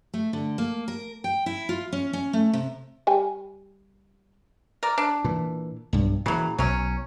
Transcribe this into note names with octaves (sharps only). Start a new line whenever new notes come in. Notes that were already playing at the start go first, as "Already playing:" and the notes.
A3
D3
A#3
A#4
G5
E4
F4
C#4
C#4
A3
C3
G3 G5 G#5
A#4 D5
D4
A#2 E3
B1 G2
A#2 C#3 E3 F#3
B1 F#3 C#4